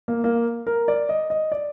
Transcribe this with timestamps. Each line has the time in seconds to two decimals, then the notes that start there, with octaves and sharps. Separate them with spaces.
0.08 A#3
0.24 A#3
0.67 A#4
0.88 D5
1.09 D#5
1.30 D#5
1.52 D5